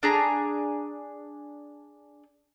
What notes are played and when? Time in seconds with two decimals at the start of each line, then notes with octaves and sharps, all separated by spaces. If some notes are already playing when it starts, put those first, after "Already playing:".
0.03 D4 G#4 A#5